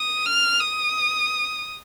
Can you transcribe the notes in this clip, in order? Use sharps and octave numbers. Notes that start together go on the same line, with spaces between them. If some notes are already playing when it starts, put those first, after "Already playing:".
Already playing: D#6
F6
D#6